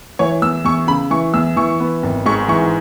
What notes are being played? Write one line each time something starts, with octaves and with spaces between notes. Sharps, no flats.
E3 C#5
E2 E6
E2 C#6
C#3 B5
E3 C#6
E2 E6
E3 C#6
B3
G#1
G#2 C#6
E3 C#6